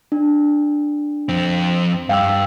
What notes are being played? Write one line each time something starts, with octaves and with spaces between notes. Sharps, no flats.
D4
F2 C4
G2 F5 G5 E6